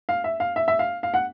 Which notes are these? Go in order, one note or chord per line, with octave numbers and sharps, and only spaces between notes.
F5
E5
F5
E5
E5
F5
F5
F#5